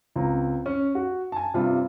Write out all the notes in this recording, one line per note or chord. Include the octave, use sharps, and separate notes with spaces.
C#2 C4 A#5
C#4
F#4
G#5 A5
G2 C3 G3 F4